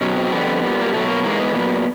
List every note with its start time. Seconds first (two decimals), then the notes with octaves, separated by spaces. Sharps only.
0.01 B2 F#3 C#4
0.16 C4
0.32 F2 D3 G3 B3
0.62 A#2 G3
0.81 A#3
0.93 B2 F#3 A3
1.08 A#3
1.23 G#2 E3 G#3 A#3
1.40 B3
1.54 A#2 F#3 B3